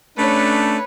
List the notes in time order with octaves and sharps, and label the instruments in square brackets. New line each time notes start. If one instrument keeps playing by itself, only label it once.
[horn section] A3 C#4 D4 [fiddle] B4 C#5